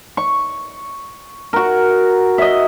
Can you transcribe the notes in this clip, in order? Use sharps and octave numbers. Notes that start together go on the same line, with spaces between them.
C#6
F#4 A#4
D#5 E5